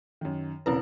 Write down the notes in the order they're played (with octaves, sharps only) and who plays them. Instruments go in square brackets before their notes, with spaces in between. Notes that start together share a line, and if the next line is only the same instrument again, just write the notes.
[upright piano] F#2 D#3
[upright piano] E1 C#3 A#5 [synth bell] C4 E4 B4